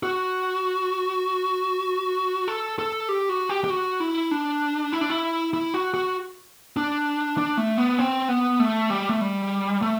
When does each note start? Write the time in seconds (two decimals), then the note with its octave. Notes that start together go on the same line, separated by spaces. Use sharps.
0.03 F#4
2.48 A4
2.79 A4
3.09 G4
3.29 F#4
3.49 G4
3.64 G4
3.70 F#4
4.00 E4
4.31 D4
4.92 E4
5.01 D4
5.10 E4
5.53 E4
5.74 F#4
5.94 F#4
6.77 D4
7.38 D4
7.57 A3
7.78 B3
7.99 C4
8.28 B3
8.60 A3
8.90 G3
9.09 A3
9.21 G3
9.82 A3